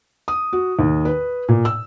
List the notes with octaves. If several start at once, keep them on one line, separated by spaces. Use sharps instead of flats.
D#6
F#4
D#2
B4
A#2
E6